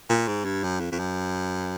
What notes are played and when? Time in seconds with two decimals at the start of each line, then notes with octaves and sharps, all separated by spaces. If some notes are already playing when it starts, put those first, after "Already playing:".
0.10 A#2
0.28 G#2
0.45 G2
0.63 F#2
0.80 F2
0.92 F2
0.99 F#2